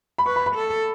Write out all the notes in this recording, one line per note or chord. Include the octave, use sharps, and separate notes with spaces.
B5
B4 C#6
B5
B5
A4